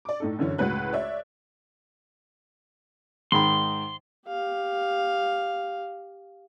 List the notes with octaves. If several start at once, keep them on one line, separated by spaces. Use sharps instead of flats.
D5 D6
A2 D#4 A4
F#2 D3 E3 C#4
C#2 A2 F#4 B4 F#6
C#5 D5 E5
G#2 D#3 B5 C6
G4 F5